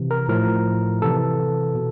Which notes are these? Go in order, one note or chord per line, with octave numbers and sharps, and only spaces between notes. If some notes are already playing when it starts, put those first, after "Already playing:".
Already playing: C3 E3
A#4
A2 F3 A#4
C3 E3 A4
B2